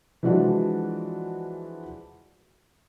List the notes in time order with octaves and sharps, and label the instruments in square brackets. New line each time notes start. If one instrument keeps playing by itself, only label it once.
[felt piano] E3 F3 G#3 D4 F#4